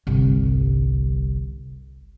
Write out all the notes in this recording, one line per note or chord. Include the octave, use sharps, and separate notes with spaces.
G1 C2